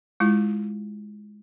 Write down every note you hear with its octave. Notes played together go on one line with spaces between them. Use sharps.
G#3 E4 F4